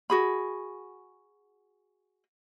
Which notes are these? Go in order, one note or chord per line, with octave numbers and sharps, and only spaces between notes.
F#4 G#4 B5